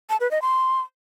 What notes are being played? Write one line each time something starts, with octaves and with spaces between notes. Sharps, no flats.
A5
B4
D#5
C6